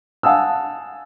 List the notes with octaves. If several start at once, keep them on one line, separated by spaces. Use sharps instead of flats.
F5 F#5 G#5 A5 D#6 E6